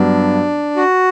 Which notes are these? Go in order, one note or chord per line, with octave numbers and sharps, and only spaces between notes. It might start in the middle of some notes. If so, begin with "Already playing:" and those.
Already playing: G2 F#3 B3 D4
F#4